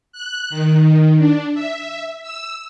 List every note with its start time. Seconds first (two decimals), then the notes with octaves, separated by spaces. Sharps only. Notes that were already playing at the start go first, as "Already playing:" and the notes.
0.13 F#6
0.50 D#3
1.19 D4
1.54 E5
2.22 E6